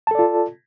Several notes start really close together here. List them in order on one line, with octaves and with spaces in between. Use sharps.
A5 A4 D5 F4